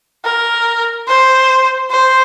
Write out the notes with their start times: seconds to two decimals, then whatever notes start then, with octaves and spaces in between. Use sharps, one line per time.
0.25 A#4
1.08 C5
1.90 C5